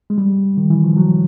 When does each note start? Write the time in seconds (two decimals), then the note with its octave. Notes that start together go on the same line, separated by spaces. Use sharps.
0.10 G#3
0.18 G3
0.57 D#3
0.70 E3
0.84 F3
0.97 F#3